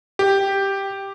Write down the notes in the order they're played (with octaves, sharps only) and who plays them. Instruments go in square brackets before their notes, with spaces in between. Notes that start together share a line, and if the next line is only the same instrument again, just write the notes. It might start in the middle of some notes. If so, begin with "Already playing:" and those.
[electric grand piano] G4